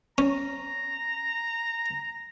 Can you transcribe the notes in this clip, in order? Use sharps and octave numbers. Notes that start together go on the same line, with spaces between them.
C#4 A#5